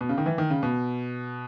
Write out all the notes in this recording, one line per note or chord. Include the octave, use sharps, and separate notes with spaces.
B2
C#3
D#3
E3
D#3
C#3
B2